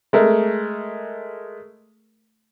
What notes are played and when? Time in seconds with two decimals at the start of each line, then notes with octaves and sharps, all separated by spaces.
0.13 G#3 A3 A#4